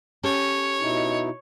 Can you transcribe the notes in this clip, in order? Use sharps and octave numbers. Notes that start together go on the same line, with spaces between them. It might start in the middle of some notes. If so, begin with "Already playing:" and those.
C#4 G4 A4 C#5
B2 D#4 E4